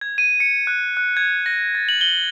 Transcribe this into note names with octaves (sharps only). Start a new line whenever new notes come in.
G#6
D#7
C#7
F#6
F#6
G#6
A#6
A6
F#7
G7